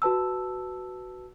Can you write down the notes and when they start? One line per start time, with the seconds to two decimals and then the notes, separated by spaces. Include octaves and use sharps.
0.02 F#4 B4 A5 E6